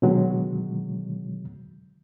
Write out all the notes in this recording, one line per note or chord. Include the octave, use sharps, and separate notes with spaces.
B2 D3 D#3 F#3 G#3